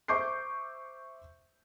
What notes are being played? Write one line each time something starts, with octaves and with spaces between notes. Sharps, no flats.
C5 E5 C#6 D6 G6 C7